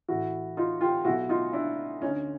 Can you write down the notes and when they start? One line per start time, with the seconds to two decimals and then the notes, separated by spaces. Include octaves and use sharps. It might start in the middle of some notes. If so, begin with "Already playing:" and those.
0.08 A1 A2 E3 E4 F#4
0.57 D#4 F4
0.81 F4 G4
1.05 B1 B2 E4 F#4
1.29 D#4 F4
1.53 D4 E4
2.02 D2 D3 C#4 D#4